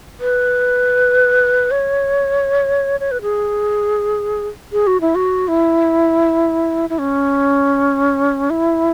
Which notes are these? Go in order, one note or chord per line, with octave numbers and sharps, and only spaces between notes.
B4
C#5
C#5
B4
G#4
G#4
F#4
E4
F#4
E4
E4
C#4
E4